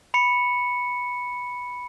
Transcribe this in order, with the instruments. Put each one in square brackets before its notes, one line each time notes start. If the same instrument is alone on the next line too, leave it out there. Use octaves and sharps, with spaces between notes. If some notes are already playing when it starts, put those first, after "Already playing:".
[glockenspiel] B5 C#7